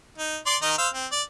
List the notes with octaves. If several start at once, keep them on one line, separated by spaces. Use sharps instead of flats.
D#4
D5 C6 D6
D#3 D#4 D#5
C5 F5 E6
C4
D5